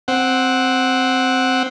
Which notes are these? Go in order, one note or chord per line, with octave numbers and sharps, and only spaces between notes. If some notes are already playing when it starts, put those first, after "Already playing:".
C4 F#5